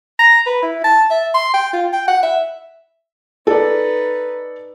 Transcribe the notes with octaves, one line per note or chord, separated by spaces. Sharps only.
A#5
B4
E4
A5
E5
C6
G5
F4
G5
F#5
E5
D#4 A4 B4 D5